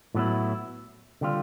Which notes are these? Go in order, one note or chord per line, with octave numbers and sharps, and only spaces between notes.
A2 F#3 B3 E4
D3 G3 C4 F4